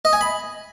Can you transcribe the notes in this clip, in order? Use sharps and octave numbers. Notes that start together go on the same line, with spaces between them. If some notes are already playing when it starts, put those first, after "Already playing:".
D#5
G#5
B5